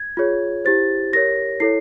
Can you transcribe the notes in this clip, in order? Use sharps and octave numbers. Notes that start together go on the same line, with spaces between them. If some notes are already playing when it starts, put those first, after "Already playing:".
Already playing: G#6
F4 G#4 C#5
E4 G4 C5 A6
G4 A#4 C#5 A#6
E4 A4 C#5 C7